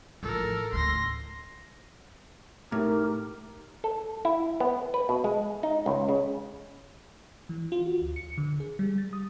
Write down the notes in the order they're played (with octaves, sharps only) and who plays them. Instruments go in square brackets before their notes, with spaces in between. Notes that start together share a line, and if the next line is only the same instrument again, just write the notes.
[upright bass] A1 F3 [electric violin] A4 A#4
[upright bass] D2 A2 [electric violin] C6 A#6
[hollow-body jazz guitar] A2 [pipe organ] D#4 G4 A#4
[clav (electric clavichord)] A4
E4
B3
B4
B2
G#3
D#4
C#2
C#3
[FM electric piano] E3
F4
F#4
D2
C#7
D3
G#4
G3
A6
D#6